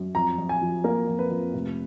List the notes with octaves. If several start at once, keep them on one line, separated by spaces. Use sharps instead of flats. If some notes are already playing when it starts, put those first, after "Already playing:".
Already playing: F#2
F2 A#5
F2
G#5
F3
A#3 A#4
F2
B4
F2
F1